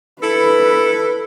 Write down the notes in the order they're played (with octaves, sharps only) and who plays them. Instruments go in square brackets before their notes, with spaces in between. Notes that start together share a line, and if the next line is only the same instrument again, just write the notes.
[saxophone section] E4 A4 [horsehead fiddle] B4